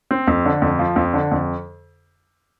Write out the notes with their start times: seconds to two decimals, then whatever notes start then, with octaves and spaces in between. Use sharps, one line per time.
0.11 C4
0.28 F2
0.45 D3
0.62 F2
0.79 F3
0.96 F2
1.14 D3
1.32 F2